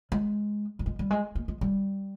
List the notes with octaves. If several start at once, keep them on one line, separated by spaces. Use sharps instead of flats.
G#3
G3
G#3
G3
G#3
A#3
G#3
G3